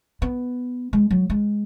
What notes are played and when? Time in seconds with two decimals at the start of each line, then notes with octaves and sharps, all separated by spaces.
0.22 B3
0.93 G#3
1.11 F#3
1.30 G#3